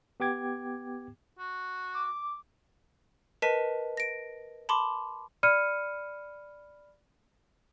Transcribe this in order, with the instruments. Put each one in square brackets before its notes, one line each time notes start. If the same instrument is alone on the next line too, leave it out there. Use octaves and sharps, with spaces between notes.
[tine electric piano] B3 G4 G5 D6 G#6
[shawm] F#4
[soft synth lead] D6
[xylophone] A#4 B4 D#5 A5 B6 D#7
A#6 D7
A5 B5 C6 D6
[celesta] D5 B5 F6 C#7 D#7